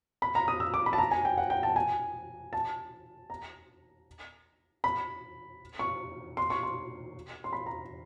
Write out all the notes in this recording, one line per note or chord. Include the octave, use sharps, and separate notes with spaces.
B5
A#5
D#6
E6
D6
B5
A5
A#5
G#5
G5
F#5
G5
A5
G#5
A5
A#5
B5
C#6
C6
C#6
C6
C6
B5
A#5